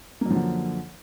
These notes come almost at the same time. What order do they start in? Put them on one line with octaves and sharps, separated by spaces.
A#3 F#2 F3 D3